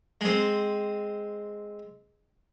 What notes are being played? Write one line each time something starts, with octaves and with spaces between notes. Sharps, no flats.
G#3 C4